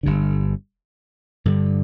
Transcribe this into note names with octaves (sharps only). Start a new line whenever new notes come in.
G1 G2 D3
G2 D3 G3